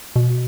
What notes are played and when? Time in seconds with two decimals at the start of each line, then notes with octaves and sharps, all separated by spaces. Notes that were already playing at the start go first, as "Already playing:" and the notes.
0.16 B2